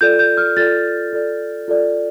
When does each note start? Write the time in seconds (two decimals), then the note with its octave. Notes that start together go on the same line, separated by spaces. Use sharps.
0.01 F4 A4 D5 G6
0.19 G6
0.37 F6
0.57 F4 A4 D5 A6
1.13 F4 A4 D5
1.68 F4 A4 D5